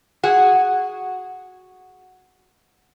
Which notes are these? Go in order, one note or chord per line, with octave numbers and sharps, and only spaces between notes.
F#4 G#4 F#5